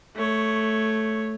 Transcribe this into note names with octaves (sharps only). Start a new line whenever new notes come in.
A3 C#5